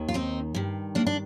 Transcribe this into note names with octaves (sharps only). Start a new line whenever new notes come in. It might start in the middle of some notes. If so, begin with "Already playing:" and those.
Already playing: D#2 D#3
F4
C4 D#4
G2 D#3
A#3 D4
D4